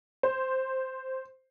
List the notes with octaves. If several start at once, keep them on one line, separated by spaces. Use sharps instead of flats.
C5